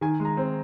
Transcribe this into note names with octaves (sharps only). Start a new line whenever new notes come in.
D#3 G#5
G#3
A#5
C4